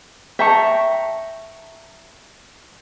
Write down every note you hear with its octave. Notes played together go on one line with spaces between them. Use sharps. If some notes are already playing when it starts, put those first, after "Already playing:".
E5 G5 A5 A#5 C#6